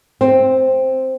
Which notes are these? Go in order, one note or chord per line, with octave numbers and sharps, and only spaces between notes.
C4